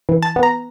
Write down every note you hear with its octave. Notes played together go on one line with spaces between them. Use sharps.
E3
A5
B3
A#5